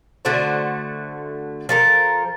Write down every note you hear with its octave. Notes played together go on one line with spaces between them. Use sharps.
D3 A3 F#4 C5
F3 A4 A#4